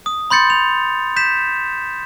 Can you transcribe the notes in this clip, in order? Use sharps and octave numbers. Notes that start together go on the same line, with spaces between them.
D#6
B5 C6 G6 A6 C#7
F7
G6 B6 E7